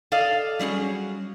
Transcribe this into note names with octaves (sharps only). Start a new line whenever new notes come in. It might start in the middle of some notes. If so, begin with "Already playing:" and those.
A4 D5 D#5 F5
F#3 G3 C#4 G#4